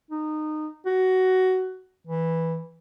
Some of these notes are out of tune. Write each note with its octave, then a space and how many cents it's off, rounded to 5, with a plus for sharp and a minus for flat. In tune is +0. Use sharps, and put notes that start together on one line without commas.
D#4 -20
F#4 +15
E3 -5